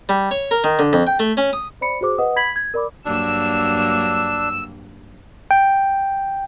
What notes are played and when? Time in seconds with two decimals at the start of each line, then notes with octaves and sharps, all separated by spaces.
0.09 G3
0.31 C#5
0.51 A#4
0.64 D#3
0.79 D3
0.93 F2
1.07 G5
1.19 A3
1.37 C#4
1.53 D#6
1.81 C5 D5 B5 C#7
2.01 F#4 G#4 C5 D6
2.18 B4 D#5 F#5 D#6
2.36 B5 G#6 B6 F#7
2.56 G#6
2.74 A#4 D5 B5 D6
3.05 G2 F#3 A#3 D4 E6
5.51 G5